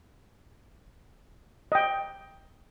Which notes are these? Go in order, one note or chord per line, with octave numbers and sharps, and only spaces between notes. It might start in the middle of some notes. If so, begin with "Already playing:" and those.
D#5 G5